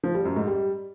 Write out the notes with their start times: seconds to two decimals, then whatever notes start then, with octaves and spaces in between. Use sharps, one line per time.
0.04 F3
0.14 G3
0.25 F#2
0.36 G#2
0.47 G3